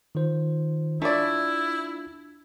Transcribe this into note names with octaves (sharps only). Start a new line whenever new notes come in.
D#3 F4 C5
A3 D4 E4 F4 D5